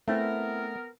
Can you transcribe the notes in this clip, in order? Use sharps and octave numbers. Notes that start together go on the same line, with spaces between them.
A3 B3 C4 E4 A#4